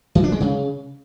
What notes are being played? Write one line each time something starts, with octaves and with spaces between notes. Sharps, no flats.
E3
D4
G#3
C#3